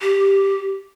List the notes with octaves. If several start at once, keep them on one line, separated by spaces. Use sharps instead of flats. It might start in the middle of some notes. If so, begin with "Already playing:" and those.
G4